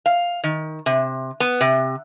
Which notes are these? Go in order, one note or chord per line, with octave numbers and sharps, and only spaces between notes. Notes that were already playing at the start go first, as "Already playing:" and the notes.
F5
D#3
C3
B3
C3